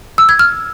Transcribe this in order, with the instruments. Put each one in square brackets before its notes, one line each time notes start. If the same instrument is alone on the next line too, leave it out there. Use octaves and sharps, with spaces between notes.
[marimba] E6
G#6
F6